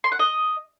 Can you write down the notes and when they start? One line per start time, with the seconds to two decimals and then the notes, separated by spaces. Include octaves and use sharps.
0.04 C6
0.12 F#5
0.19 D#5